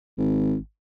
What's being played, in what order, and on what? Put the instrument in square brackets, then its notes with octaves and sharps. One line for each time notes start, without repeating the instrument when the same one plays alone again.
[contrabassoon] G#1